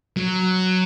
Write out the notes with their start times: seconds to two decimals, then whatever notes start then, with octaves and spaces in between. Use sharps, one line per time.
0.17 F#3